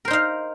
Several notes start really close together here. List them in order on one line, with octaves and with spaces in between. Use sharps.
A#4 C5 D#4 F5